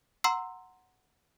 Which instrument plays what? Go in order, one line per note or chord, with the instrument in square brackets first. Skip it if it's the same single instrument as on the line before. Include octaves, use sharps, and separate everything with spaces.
[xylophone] F#5 A#5 C6 E6 C7